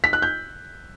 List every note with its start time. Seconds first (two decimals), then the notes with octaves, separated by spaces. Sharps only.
0.04 B6
0.13 F#6
0.22 G6